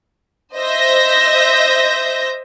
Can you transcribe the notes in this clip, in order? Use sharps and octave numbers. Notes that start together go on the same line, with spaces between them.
C5 D#5 E5 G6 A#6